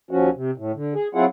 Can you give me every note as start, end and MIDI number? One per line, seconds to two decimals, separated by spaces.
0.11 0.30 39
0.11 0.30 53
0.11 0.30 61
0.11 0.30 66
0.35 0.51 48
0.58 0.72 45
0.75 0.94 50
0.95 1.07 68
1.15 1.26 54
1.15 1.26 60
1.15 1.26 64
1.15 1.26 65
1.15 1.26 68
1.15 1.26 78